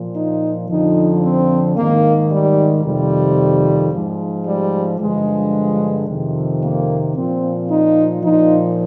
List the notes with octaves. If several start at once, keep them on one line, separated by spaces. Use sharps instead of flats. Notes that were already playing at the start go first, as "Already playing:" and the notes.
Already playing: A#2 F3
D#4
F2 D3 F3 D#4
C4
G#2 D#3 A#3
G3
F2 C3 D#3 G3
G#2 F3
G3
G2 D3 F3 G#3
F2 C3 D#3
A#3
A#2 F3 C4
D#4
A#2 F3 D#4